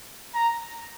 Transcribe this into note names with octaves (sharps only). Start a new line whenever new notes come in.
A#5